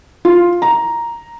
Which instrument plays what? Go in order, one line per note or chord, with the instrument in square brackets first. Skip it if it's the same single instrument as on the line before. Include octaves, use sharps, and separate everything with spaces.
[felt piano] F4
A#5